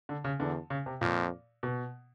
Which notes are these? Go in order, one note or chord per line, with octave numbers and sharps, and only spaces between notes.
D3
C#3
E2 D3
C#3
C3
F2 A#2
B2